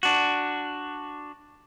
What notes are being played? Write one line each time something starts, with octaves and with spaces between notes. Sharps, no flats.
D4 F#4